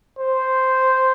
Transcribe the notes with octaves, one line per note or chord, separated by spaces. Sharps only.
C5